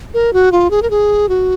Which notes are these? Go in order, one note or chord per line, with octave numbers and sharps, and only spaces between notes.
A#4
F#4
F4
G#4
A#4
G#4
F#4